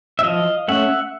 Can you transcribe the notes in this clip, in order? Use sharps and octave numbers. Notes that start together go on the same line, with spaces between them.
E5
F3 D#5 F5
A3 C#4 E5 F#5